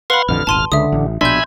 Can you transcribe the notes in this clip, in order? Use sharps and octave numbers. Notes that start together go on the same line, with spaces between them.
B4 F5 F#5 B5 C6
A1 F2 D3 F6
D#1 G#1 A5 C6 D#7
C#2 D3 E5 D#6
A1
A#1 B2 D4 E5 G#5 B5 C6 G6